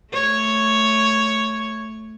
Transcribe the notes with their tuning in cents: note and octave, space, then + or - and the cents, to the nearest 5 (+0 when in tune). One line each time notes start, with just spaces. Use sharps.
A3 +0 C#5 +0